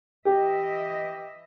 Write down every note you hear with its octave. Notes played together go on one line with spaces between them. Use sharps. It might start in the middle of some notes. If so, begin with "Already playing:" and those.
E3 G4 D#5 E5